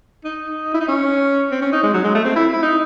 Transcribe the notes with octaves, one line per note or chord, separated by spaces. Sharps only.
D#4
E4
D#4
C#4
C4
C#4
D#4
G#3
F#3
G#3
A3
C4
E4
E4
D#4